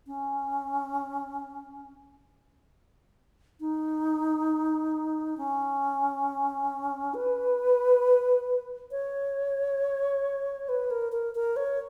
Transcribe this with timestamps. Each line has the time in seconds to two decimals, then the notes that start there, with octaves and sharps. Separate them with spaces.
0.07 C#4
3.60 D#4
5.37 C#4
7.14 B4
8.91 C#5
10.69 B4
10.90 A#4
11.12 A#4
11.35 A#4
11.56 C#5